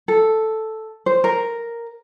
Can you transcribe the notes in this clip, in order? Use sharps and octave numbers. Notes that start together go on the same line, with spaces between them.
A4
C5
A#4